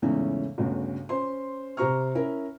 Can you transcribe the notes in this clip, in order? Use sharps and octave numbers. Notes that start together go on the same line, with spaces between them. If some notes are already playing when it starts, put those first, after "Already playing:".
E2 G#2 C#3 E3 A3 C#4
G1 D2 C#3
C#4 C5 C6
C3 G4 C5 A#5 C#6 F6
C#4 E4 A#4